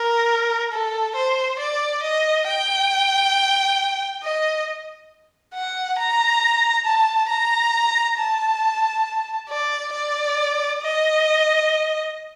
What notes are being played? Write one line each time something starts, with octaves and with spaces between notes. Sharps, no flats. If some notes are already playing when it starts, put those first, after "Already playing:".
Already playing: A#4
A4
C5
D5
D#5
G5
D#5
F#5
A#5
A5
A#5
A5
D5
D5
D#5